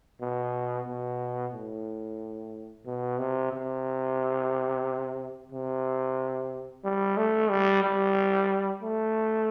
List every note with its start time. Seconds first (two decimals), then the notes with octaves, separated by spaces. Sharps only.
0.21 B2
0.88 B2
1.53 A2
2.86 B2
3.19 C3
3.53 C3
5.52 C3
6.84 G3
7.17 A3
7.50 G3
7.84 G3
8.83 A3